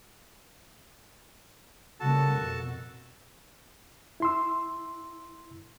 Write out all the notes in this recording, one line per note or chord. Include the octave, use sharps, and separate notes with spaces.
C#3 G3 A#3 F#4 A4 A5
F2 B2
E4 C6 E6